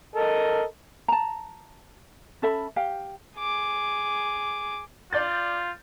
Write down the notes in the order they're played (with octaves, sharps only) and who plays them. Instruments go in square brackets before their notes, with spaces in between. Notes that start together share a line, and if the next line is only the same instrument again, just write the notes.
[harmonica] A4 A#4 D#5
[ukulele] A5 A#5
C#4 A4 E5 B5
G4 F5 G5
[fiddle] G#4 D6
[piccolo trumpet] F4 [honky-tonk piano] D5 G6 A6